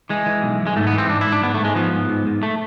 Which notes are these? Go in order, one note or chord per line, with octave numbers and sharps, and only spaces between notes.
E3 G#3
E3
B1
B1
G#3
G#2 A3
B3
E3
C4
G#2 D4
E4
G#2
D4
G#2 B3
A3
G#2 G#3
F3 B3
G#2
G#2
G#2
A3